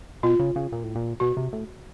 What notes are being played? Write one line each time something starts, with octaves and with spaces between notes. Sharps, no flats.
B2 F4
C#3
C#3
A#2
A2
A#2
B2 F#4
C3
A2